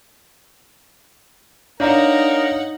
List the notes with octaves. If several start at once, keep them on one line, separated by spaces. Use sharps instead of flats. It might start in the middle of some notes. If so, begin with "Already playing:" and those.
D4 D#4 A#4 C#5 F5 F#5 A#5